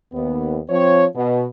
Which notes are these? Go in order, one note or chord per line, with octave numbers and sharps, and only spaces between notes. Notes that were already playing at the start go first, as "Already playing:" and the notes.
D#2 B3
F3 C4 C#5
B2